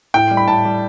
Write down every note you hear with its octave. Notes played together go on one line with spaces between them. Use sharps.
A2 G5
G3
B5
A2 A5
G3